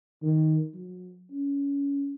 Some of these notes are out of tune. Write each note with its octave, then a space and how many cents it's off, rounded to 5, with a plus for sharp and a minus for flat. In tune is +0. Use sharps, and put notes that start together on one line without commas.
D#3 +5
F#3 -30
C#4 +20